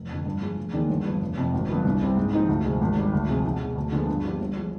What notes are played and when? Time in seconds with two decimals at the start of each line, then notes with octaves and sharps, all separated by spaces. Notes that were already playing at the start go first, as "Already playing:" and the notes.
Already playing: F1
0.09 F2 D3
0.25 G2
0.42 F3 G#3
0.57 F1
0.74 D#2 D#3 G#3 D4
0.89 G1
1.05 G2 F3 B3
1.21 F1
1.37 F2 C3 F3
1.53 G#1
1.69 G2 D3 F3 B3
1.85 C2
2.01 C3 G3 C4
2.17 G#2
2.33 F3 C4 D#4
2.48 D2
2.65 C3 F3 G#3 C4
2.81 G#1
2.96 G#2 G3
3.13 D2
3.29 C3 F3 G#3
3.45 B1
3.60 B2 G#3
3.76 D2
3.92 D3 F3 G#3 B3
4.09 G2
4.24 F3 B3 D4 G4
4.40 G1
4.57 F3 G#3